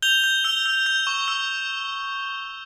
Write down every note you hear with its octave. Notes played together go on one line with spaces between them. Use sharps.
G6 F7 G7
G6
E6
E6
G6
C#6
E6